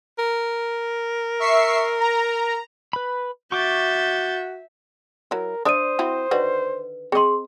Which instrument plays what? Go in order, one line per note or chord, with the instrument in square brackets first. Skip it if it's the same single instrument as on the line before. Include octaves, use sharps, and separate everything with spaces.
[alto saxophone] A#4
[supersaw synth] E5 C#6 C7
A#5
[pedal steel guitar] B4 B5
[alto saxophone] F#4 [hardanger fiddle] E5 [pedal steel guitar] C#6 D6 [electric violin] G6 A6
[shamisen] F#3 E4 [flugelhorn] A#4
[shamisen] D4 D5 E5 [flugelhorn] C5 [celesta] D#6 D#7
[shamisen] C4 E4 F#4
[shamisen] D3 D#3 F#4 [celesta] B4
[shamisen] C4 D#5 [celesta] G#4 C6